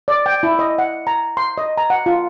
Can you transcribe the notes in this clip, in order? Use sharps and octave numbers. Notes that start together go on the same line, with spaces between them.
D5
G5
E4
D#5
F#5
A#5
C6
D#5
A#5
F#5
F4